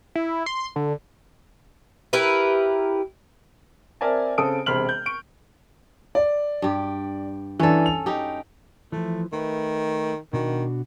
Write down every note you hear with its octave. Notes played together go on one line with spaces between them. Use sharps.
E4
C6
D3
E4 G4 A#4 B4
C4 A#4 D5 E5 G#5 A5
C#3 C4 A4 D#6 D7
E1 C3 C5 B5 F6 F#7
G6
C#6 D7
D5
G2 G4
E3 C#4 D4 A4
F7
D#4 G4
E3 F3 A3
D#3 A3 B4
B2 D#3 D4 F#4